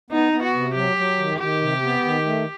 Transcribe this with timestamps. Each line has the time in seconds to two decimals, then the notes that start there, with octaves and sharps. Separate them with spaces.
0.10 B3 D#4
0.32 B3
0.43 F#4
0.54 C3
0.75 F#3 G4
0.97 F#3
1.18 D#3
1.40 D#3 G4
1.61 C3
1.83 B3
2.05 D#3
2.25 A3